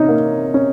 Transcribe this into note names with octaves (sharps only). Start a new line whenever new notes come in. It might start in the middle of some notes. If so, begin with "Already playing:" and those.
Already playing: C3 C#4 D#4
A#3
C#4